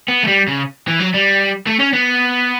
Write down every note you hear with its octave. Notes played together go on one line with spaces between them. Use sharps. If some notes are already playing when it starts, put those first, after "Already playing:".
B3
A3
G3
C#3
E3
F#3
G3
A3
C#4
B3